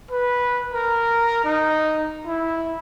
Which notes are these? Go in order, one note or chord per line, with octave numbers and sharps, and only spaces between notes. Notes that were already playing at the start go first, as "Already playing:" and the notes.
B4
A#4
D#4
E4